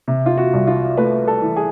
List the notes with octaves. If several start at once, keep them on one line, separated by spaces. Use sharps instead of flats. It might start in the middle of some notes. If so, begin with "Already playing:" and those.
C3
F4
F#4
C2
F4
A3 B4
A4
E3
G#4